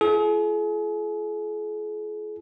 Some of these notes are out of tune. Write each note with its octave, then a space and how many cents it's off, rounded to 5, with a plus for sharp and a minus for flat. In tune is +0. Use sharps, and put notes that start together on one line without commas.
F4 -40 G#4 +40